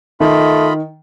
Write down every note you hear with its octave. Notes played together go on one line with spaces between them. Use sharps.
D#3 A3 F4 D#5 B5